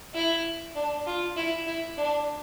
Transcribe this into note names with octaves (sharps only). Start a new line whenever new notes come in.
E4
D4
F4
E4
E4
D4